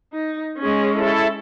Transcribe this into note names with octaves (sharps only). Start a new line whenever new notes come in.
D#4
G#3 C#4
E4 A4